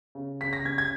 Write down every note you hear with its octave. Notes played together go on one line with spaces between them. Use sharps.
C#3
C#3 B6
A#6
C#4 G#6
G#6